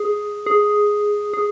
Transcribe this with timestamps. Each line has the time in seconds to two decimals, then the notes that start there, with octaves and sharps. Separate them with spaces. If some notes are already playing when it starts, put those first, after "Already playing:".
Already playing: G#4
0.46 G#4
1.33 G#4